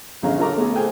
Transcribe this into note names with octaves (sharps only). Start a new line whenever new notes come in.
A#1 D3 C#4 F5 A#5
F4 A4 A#4 A#5 D6
A3 B3 G#4
G#4 C5 G5 G#5